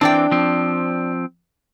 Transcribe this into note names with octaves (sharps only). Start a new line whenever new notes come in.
E3 C4 D4 D5 G5
F3 C4